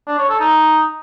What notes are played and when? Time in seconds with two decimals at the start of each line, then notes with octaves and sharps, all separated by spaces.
0.07 D4
0.18 C#5
0.29 A4
0.40 D#4